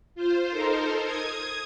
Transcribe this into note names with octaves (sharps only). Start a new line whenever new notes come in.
F4 C5
D#4 A4 A#4 C5
D#6 G#6